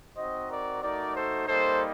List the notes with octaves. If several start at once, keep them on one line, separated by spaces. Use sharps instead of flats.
C4 D#4 F#4 C5 D#5
A#4 D5
A3 D#4 F#4 A#4 D5
A4 C5
G3 A#3 D#4 A4 C5